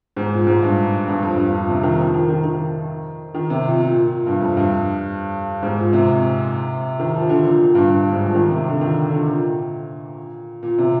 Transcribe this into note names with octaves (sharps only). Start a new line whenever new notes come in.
G#2
A#2
G#2
G2
G2
F2
G2
A#2
C3
D#3
F3
D#3
D#3
D#3
D#3
C3
A#2
A#2
A#2
G2
F2
G2
G#2
A#2
C3
D#3
F3
D3
A#2
A#2
G2
G2
G#2
F3
D#3
C3
D3
D#3
D3
A#2
A#2
C3